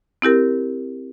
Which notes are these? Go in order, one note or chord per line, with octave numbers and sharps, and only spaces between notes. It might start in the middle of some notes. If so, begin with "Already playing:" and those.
C4 E4 G4 A#4